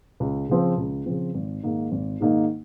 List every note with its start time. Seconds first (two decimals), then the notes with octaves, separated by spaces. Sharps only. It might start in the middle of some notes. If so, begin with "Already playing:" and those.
0.20 C#2
0.49 C#3 F3 C4
0.78 C#2
1.06 C#3 F3 C4
1.35 G#1
1.63 G#2 D#3 A#3 D#4
1.92 G#1
2.20 G#2 D#3 A#3 D#4